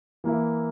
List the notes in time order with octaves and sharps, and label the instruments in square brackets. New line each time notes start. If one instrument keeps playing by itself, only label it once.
[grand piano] E3 A#3 E4